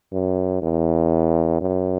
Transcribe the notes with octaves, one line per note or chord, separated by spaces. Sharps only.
F#2
E2
F#2